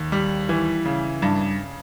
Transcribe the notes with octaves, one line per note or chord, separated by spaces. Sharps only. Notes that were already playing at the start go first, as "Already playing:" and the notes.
Already playing: D#2
G3
E3
C#3
G2